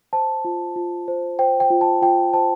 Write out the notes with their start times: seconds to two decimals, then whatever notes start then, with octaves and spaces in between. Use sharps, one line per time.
0.13 C5 A5
0.45 F4
0.76 F4
1.08 C5
1.39 C5 G5
1.60 G5
1.70 F4
1.81 A5
2.02 F4 G5
2.33 C5 A5